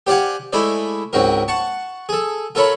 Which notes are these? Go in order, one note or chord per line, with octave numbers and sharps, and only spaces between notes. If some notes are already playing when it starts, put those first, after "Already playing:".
G4 C5 D5 F5 F#5 G#5
G#3 A3 E4 C5 D5
C#2 G#2 C4 F#4 A#4
F#5 A5 C#6
G#4 A4
F4 A4 A#4 C#5 B5